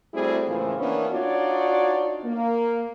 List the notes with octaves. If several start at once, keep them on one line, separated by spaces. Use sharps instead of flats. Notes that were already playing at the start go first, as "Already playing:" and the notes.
G3 A3 C4 E4 F#4 G#4
A2 C#3 E3 F3 A3 A#3
E3 A#3 B3 C#4 D4
D4 D#4 F4 F#4 C#5 D5
A#3